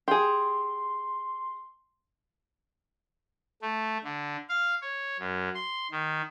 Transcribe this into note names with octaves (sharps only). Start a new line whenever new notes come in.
G4 G#4 C6
A3
D3
F5
C#5
F#2
C6
D#3